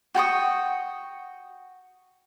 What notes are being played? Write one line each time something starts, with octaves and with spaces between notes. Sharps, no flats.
F#4 G5 C#6 D#6